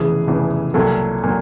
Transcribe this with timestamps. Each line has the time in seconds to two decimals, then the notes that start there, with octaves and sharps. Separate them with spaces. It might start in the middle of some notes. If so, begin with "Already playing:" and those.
Already playing: F1 E2 C#3 E3 G#4
0.28 F1 E2 C#3 E3
0.74 C2 A#2 F#3 A4
1.23 A#2 F#3